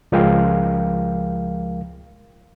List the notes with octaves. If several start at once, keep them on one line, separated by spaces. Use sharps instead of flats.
C#2 F3 G#3 A#4 F5 G5